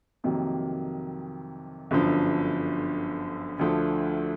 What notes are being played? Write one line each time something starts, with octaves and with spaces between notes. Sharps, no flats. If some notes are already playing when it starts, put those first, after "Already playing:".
F2 C3 D#3 F#3 A#3
G1 F#2 D3 F3
D2 D3 F3 A3